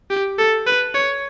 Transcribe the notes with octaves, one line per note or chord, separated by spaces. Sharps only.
G4
A4
B4
C#5